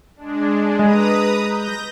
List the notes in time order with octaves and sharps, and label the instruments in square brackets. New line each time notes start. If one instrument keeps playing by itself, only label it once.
[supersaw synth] G#3 D4
[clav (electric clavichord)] G#3 [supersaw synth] B4 A#5 D#6
[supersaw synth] G6 A#6